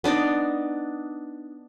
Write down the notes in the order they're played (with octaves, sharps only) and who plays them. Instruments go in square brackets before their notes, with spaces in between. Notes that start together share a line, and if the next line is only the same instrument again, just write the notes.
[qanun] B3 D4 D#4 D5